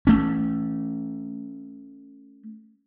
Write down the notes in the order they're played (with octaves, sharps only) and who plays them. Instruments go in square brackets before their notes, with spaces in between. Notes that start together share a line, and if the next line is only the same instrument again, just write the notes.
[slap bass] A3 C#4